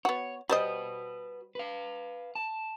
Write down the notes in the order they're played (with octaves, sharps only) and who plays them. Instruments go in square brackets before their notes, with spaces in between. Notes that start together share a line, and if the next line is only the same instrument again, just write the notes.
[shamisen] B3 F#4 [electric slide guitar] C#5
[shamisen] G3 C5 D#5 [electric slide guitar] F#4 B4
[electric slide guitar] B4 F5
A5